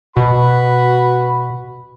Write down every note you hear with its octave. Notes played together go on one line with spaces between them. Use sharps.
B2 F#4 B4 B5